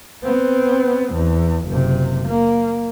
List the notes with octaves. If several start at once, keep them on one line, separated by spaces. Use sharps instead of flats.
B3 C4
E2
F#1 C3
A#3